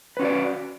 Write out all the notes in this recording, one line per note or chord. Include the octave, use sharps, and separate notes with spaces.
C#4 F#4 B4 D5